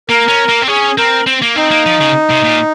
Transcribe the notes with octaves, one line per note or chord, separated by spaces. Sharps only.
A#3 A#4
C#4
A#3
C4
C#4 G#4
C4 A#4
C4
A#3
C4 D#4
A#3
F3
C#3
C3
A#2